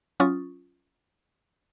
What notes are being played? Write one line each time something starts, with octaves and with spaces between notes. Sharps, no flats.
F#3 C#4 F4 C#6 D#6 A6